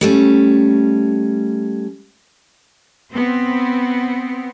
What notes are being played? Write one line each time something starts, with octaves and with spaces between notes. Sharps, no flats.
G3 A3 C#4
B3 C4